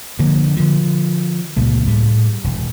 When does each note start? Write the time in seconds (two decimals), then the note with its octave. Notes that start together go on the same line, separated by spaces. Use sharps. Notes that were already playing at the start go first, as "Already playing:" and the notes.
0.19 D3 F3 A#3
0.57 D3 F3
1.57 C#2 A#2 G3
1.87 A2 G3
2.44 E1